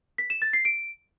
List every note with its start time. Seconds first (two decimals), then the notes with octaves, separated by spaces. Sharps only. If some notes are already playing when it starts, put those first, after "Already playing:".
0.18 B6
0.30 E7
0.42 A6
0.53 C7
0.65 D7